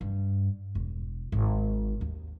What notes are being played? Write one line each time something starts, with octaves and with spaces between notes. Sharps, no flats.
G2
E1
G#1
D#2